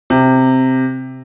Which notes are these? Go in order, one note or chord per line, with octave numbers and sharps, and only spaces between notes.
C3